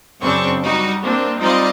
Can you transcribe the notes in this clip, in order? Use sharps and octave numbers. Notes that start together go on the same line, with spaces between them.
F#2 C#3 C4 D4 C#6
G3 D#4 F#4
A#3 C4 D4
G3 C4 D#4 F4 D5 D#5